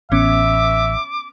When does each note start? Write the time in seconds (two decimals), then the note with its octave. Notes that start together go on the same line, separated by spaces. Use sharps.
0.12 A1 B3 C#4 E5 D6